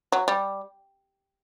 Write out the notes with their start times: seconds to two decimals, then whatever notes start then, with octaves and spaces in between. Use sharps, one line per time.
0.12 F#3
0.28 G3